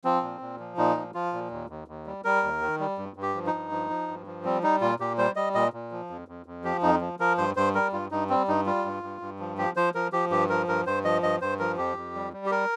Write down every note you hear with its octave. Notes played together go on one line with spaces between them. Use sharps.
F3 C4
A#2
A#2
F3
A#2 D#4
F3
F3 F4
A#2
D#2
D#2
D#2
G3
G3 A#4
D#2
D#3
G3
G2
G2
G4
F3
D#4
G2
F3
F3
G2
F3
G3 C4
G3 D#4
A#2 F4
A#2 G4
G3 C5
G3 D#5
A#2 D#5
A#2
F3
F2
F2
F2
F3 G4
F2 D#4
F3
F3 A#4
G2 C5
G2 C5
G3 A#4
G2 F4
G2 D#4
G3 C4
G2 D#4
G3 F4
G2
G2
G2
F3
F3 G4
F3 C5
F3 A#4
F3 G4
G2 G4
F3 A#4
G2 A#4
G2 C5
F3 D#5
G2 D#5
G2 C5
F3 A#4
F2 G4
F2
G3
G3
G4
A#4